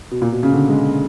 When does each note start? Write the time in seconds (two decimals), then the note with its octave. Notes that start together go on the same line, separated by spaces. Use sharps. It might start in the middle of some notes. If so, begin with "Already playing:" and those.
0.11 B2
0.22 A#2
0.32 B2
0.43 C#3
0.53 D3
0.69 G#3